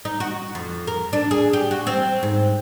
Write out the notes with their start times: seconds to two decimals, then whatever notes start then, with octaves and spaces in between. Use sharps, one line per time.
0.05 D#4
0.20 F#4
0.55 F2
0.87 A#4
1.13 D4
1.31 G#4
1.53 G4
1.71 F#4
1.87 C4
2.23 G#2